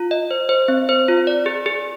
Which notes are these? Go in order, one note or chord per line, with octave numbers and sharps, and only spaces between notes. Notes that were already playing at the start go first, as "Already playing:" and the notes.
Already playing: F4
D#5
C5
C5
C4
C5
F4
D5
G#4
G#4